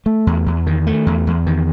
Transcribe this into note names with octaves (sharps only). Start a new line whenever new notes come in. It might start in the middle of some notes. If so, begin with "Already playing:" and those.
A3
E2
E2
D#3
A3
E2
E2
D#3